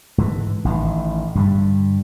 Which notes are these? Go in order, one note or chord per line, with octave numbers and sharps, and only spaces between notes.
G#2 D3 E3
A1 A2 D#3
G2 D3 G3